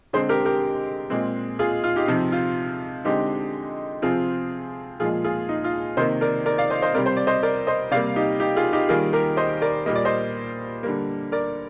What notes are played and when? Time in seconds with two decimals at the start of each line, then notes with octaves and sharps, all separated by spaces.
0.13 D3 G#3 C4 G#4 C5
0.29 G4 A#4
0.45 G4 A#4
1.10 A#2 G#3 C4
1.59 F4 G#4
1.84 F4
1.96 D#4 G4
2.08 C3 F3 C4 D#4
2.32 F4
3.05 D3 G#3 C4 D#4 G4
4.02 C3 F3 C4 F4 G#4
5.00 A#2 F3 G#3 F4 G#4
5.24 F4 G#4
5.49 D#4
5.64 F4
5.97 C3 D#3 A#3 C5 D#5
6.21 A#4 D5
6.46 A#4 D5
6.58 D5 F5
6.70 C5 D#5
6.82 C5 D#5
6.94 C3 G3 C4 A#4 D5
7.06 C5
7.17 D5
7.27 C5 D#5
7.43 A#4 D5
7.67 C5 D#5
7.91 C3 G3 A#3 D5 F5
8.16 D#4 G4
8.40 D#4 G4
8.56 F4 G#4
8.73 D#4 G4
8.89 D#3 G3 A#3 F4 G#4
9.13 G4 A#4
9.37 C5 D#5
9.62 A#4 D5
9.86 A#2 G3 A#3 D#5
9.95 D5
10.05 C5 D#5
10.83 D3 G3 A#3
11.32 A#4 D5